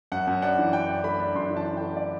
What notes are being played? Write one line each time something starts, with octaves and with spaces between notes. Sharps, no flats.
F#2 F#5
F#2
D4 F#5
E3
F#2 G5
D4
A3 B5
D4
F#2 C6
E3
A5
E3
A3 G5
D5